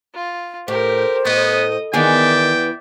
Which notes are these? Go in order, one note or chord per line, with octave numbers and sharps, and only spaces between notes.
F4
A2 G4 A#4 C5
A2 B3 D#5 D#6
D#3 E3 B3 G#4 D5 E5 G5